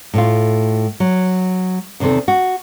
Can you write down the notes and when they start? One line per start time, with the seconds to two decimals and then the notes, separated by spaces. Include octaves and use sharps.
0.14 A2 A3 F4
1.00 F#3
2.00 E2 C3 D#3 C4 A4
2.28 F#4